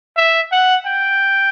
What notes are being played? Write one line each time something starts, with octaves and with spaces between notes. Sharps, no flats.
E5
F#5
G5